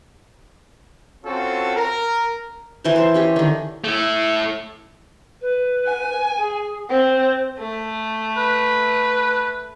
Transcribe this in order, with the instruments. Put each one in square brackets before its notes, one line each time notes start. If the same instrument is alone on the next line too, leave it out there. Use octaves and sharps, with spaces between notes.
[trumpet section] C4 C#4 F4 F#4 A4
A#4
[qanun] E3 E4 A#4 C5
C5 A5
C#4 G4 C#5
D3 D#3
[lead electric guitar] A3 E4
[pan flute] B4
[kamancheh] G#5
[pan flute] G#4
[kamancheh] C4 [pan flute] C5
[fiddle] A3
[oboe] B4